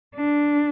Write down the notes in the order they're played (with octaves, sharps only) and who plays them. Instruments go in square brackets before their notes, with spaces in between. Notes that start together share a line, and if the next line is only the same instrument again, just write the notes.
[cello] D4